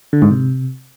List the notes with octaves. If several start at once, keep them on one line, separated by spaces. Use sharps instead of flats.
D3
G#2
C3